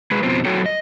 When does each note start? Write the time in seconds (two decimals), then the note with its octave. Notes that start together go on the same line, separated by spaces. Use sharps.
0.11 G#3 G#4 B4
0.23 F2 B2 C4
0.45 F#2 F#3 F#4 A4 C#5 G5
0.66 D#5